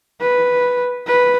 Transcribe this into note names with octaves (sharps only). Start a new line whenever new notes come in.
B4
B4